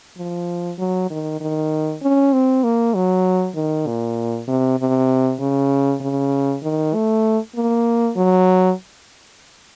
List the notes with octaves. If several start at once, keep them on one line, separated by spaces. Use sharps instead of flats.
F3
F#3
D#3
D#3
C#4
C4
A#3
F#3
D#3
A#2
C3
C3
C#3
C#3
D#3
A3
A#3
F#3